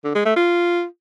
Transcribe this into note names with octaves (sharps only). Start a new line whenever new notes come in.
D3
G#3
A3
F4